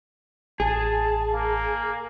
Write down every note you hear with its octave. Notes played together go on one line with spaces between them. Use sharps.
A1 G#4 A5
A#3